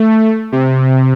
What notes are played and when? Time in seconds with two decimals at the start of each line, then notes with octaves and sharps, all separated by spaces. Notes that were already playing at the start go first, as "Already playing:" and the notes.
Already playing: A3
0.52 C3